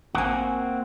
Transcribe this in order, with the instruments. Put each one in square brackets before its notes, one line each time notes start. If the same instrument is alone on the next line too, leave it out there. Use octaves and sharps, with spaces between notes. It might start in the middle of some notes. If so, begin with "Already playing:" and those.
[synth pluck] A1 G#5 [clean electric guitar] A#3 C4 F#4